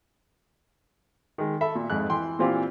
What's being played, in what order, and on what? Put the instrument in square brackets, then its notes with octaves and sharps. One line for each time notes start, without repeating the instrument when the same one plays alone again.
[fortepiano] D#3 G#3
A4 E5 B5
A#2
F2 G#2 F#6
E3 G5 C6
A#2 E3 C4 F4 G4